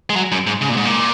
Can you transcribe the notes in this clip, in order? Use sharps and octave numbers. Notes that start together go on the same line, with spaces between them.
G#3
F#3
F#2
G#2
C#3
A#2
G#2
A#2